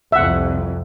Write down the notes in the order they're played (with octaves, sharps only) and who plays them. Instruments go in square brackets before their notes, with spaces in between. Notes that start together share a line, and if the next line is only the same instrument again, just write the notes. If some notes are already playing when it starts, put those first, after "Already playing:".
[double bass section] C2 F2 [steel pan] E5 F#5